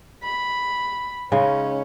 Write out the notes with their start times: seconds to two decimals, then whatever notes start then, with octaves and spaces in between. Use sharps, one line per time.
0.23 B5
1.32 C#3 G#3 C#4 D#4